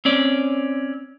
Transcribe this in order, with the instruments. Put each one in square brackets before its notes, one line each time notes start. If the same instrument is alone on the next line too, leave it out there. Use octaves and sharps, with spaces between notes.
[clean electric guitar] C4 C#4 D5